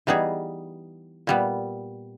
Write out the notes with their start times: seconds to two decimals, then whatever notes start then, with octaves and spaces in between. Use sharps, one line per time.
0.07 E3 G3 B3 D#4 G#4
1.27 A#2 G3 B3